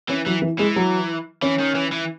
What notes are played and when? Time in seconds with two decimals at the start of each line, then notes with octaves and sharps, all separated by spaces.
0.09 E3 C#4
0.26 E3 F#3
0.42 E3
0.59 E3 G#3
0.76 F#3
1.42 E3 C#4
1.60 D#3
1.75 E3
1.92 E3